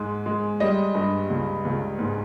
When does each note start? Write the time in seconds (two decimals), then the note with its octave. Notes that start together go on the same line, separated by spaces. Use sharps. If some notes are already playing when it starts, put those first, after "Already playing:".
Already playing: G#2 G#3
0.26 G#3
0.60 G3 D#5
0.95 G2
1.30 C#2
1.65 C#2
1.99 G#2